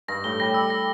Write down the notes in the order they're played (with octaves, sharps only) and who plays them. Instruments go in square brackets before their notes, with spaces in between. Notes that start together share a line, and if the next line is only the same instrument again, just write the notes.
[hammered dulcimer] G2 [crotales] A#6
[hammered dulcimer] A2 [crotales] G7
[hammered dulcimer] G3 [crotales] A#6
[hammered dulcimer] G3 [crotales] E6
[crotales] A#6